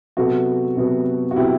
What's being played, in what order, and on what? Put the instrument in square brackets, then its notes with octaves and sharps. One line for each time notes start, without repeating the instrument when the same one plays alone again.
[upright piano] C3 F#3 B3 F#4 A4
C3 F#3 B3
F#4
C3 F#3 B3 E4 G4